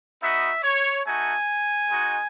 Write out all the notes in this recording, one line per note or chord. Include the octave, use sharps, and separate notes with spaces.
B3 D#4 F#4 E5
C#5
A3 D#4 F#4 G#5
G#3 D#4 F#4